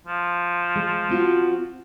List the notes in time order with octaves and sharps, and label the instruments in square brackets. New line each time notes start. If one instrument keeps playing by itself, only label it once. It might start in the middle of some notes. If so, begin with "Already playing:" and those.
[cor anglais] F3
[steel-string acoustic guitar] G#3
C4 F4 F#4